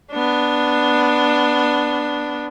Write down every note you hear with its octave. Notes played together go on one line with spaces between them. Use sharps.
B3 D4